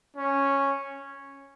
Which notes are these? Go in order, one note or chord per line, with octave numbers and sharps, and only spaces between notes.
C#4